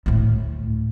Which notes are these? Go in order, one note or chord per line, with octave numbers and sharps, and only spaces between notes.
D2 A2